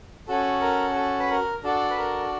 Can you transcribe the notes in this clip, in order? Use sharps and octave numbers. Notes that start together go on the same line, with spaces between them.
C#4 F#4 A4
A#4
A4
B4
A#4
D4 F#4 A4
B4
A#4